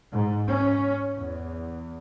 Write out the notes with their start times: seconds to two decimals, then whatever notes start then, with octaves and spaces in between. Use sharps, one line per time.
0.11 G#2
0.47 C#4
1.15 E2